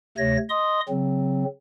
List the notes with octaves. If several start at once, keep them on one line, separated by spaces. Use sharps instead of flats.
D2 C3 A3 C#5 A#6
D#5 C6 D#6
C#3 F#3 C4